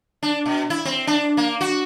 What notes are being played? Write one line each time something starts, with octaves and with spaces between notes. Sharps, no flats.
D4
B2
E4
C4
D4
A#3
F#4